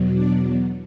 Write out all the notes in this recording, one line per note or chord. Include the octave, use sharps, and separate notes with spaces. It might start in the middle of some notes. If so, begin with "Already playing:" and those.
Already playing: E2 B2 F#3
D4 D5